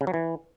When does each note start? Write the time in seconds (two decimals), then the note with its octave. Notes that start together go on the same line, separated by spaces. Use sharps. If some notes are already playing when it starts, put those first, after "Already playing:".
0.01 C#3
0.07 F#3
0.14 E3